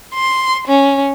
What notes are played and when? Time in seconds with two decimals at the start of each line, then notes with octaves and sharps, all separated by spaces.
0.14 C6
0.67 C#4